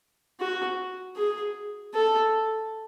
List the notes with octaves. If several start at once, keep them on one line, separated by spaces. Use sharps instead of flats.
F#4
G#4
A4